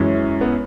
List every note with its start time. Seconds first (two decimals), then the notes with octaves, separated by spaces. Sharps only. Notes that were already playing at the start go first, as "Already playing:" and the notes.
Already playing: F#2 E3 G#3 C#4
0.41 B3